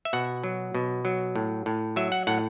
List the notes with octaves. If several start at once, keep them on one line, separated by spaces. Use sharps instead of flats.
E5
B2 F#5
F#3
B2
F#3
A2
A2
F#3 E5
F#5
A2 F#5